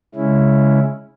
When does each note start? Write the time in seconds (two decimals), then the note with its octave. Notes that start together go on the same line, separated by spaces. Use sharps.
0.14 C#3 G#3 C#4 E4